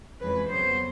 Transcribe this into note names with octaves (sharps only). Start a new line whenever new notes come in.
F2 C#3 E3 G#3 B4
F2 C#3 F#3 B3 C5